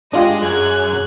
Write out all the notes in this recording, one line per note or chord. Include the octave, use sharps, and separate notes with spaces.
G#3 D4 F4 G4 D#5
F#2 G#4 F#6 G#6